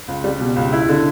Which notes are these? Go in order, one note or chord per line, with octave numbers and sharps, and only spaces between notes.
C#2
G3
B2
C#2
E4
D3